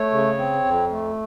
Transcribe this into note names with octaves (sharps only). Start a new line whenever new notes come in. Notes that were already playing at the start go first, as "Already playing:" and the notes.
Already playing: A3 C#5
C#3
C4
F2
A3